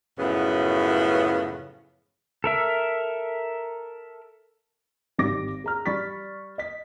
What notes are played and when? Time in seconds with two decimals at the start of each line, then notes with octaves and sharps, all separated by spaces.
0.19 F#2 A2 C#3 F3 B3
2.44 A4 A#4 E5
5.18 G#1 G3 C4 D6 A#6
5.64 G#4 A#5 F6
5.86 G3 D5 B5 C#6 A6 B6
6.58 D#5 B6